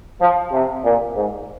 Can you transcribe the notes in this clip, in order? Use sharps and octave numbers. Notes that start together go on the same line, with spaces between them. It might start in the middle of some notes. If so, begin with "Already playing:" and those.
F3
C3
A#2
G#2